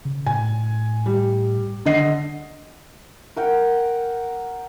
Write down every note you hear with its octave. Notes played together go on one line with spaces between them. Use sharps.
C#3
A2 G#5
G3
D3 D#5 C7
A#4 F#5 G5